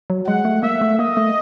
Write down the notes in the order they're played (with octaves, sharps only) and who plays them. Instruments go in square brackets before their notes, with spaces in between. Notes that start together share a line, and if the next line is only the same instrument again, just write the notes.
[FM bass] F#3
[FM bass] G#3 [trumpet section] F#5
[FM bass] A3
[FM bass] A#3 [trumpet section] E5
[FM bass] A3
[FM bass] A#3 [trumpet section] D#5
[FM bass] A3